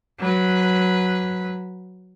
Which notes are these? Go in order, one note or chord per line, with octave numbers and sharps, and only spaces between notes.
F#3 B4